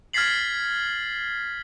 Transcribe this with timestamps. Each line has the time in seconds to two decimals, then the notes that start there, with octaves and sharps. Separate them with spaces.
0.13 F6 G#6 A6 B6 C7 F#7